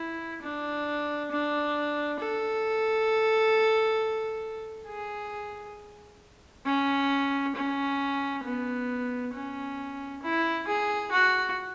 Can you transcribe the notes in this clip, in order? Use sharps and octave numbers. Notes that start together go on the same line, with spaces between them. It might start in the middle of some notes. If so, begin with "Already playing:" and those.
Already playing: E4
D4
D4
A4
G#4
C#4
C#4
B3
C#4
E4
G#4
F#4